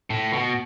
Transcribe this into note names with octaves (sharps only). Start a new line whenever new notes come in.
A2
B2